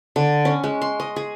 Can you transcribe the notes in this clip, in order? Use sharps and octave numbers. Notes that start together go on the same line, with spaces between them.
D3
C#4
G#3
C6
D#5
G#4